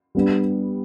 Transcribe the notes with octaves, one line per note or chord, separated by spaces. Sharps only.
G3 B3 D4